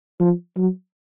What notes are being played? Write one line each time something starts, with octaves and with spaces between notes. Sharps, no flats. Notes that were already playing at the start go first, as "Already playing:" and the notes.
F3
F#3